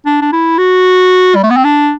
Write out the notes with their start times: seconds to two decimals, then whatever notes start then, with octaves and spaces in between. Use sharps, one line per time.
0.06 D4
0.22 D4
0.33 E4
0.58 F#4
1.36 G3
1.43 A3
1.51 B3
1.57 C4
1.65 D4